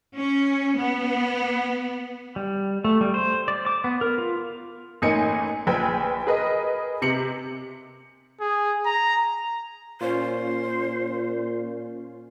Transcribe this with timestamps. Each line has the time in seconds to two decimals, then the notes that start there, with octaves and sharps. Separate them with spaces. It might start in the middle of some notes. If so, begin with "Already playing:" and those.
0.17 C#4
0.77 B3
2.36 G3
2.85 A3
3.01 G3
3.14 C5
3.48 D5
3.66 D6
3.84 B3
4.01 A#4
4.18 F4
5.02 A1 A#3 D#4 G#5 C#7
5.67 A#1 B4 G5 G#5 G#6
6.27 G#4 A#4 B4 D#5
7.02 C3 C#7 F#7
8.41 G#4
8.86 A#5
10.01 A#2 C#4 F4 C5